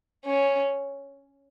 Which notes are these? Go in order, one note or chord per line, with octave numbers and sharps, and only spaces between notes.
C#4